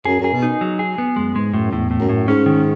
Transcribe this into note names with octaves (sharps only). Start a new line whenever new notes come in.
F#2 G#4
F#2 G#4
B2
D#4
F#3
G#4
B3
F#2 G#3
G#2 G#3
F#2 A2
E2 A2
A2
F#2
A2
G#2 C#4
D#3